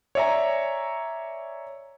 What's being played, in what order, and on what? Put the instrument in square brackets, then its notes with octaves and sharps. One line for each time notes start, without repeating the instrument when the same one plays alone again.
[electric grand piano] C#5 D5 E5 G#5 A#5